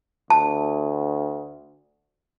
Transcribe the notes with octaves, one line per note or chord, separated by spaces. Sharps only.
D2 A5